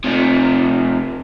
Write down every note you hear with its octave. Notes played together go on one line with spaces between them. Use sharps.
C3 A3